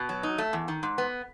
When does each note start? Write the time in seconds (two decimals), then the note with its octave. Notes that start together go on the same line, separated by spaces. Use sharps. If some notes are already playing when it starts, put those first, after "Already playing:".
Already playing: B2
0.09 F#3
0.23 D#4
0.38 A3
0.53 E2
0.68 D#3
0.83 G#2
0.98 B3